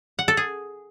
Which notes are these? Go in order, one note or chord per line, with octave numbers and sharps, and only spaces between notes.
F#5
A4
G#4